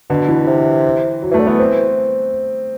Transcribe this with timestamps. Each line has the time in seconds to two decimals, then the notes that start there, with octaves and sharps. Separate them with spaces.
0.09 B2 D3
0.29 E3
0.47 C3
1.22 F#3
1.31 E3 A3
1.40 D3
1.47 E3 B3
1.59 C4